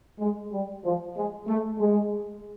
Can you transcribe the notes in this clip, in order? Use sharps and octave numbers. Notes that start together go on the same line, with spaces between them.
G#3
G3
F3
G#3
A3
G#3